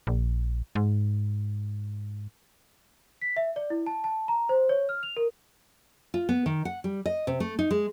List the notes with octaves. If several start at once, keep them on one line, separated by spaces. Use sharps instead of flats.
A#1
G#2
B6
E5
D5
E4
A5
A5
A#5
C5
C#5
F6
F7
A#4
F4
B3
D#3
F#5
G3
D#5
C3
A3
D#4
G#3